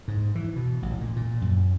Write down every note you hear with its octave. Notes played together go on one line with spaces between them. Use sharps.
G#2
E3
B2
A1
A#2
A#2
F#2